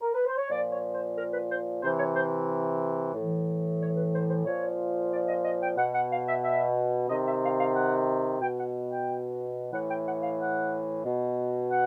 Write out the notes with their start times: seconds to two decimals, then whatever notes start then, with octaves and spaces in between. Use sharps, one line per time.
0.02 A#4
0.15 B4
0.26 C5
0.37 C#5
0.50 A#2 F3 D5
0.72 C#5
0.94 C5
1.16 A#4
1.32 B4
1.49 C5
1.82 C3 E3 C5
1.98 C#5
2.15 C5
3.14 A2 E3
3.80 C#5
3.96 B4
4.13 C5
4.29 C5
4.45 A#2 F3 C#5
5.12 D5
5.28 D#5
5.44 D#5
5.61 G5
5.78 B2 F#5
5.95 F#5
6.11 F5
6.27 E5
6.43 E5
7.09 C3 D#3 D#5
7.26 E5
7.43 F5
7.59 F5
7.75 F#5
8.41 B2 G5
8.58 F#5
8.91 G5
9.73 A2 E3 F#5
9.89 G5
10.06 F#5
10.23 F5
10.39 F#5
11.05 B2
11.70 F#5